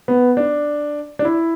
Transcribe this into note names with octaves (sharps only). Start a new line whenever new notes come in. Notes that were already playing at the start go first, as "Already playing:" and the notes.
B3
D4
D4
E4